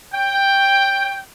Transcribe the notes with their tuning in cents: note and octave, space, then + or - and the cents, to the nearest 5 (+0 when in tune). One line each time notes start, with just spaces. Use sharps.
C#5 +0 G5 +5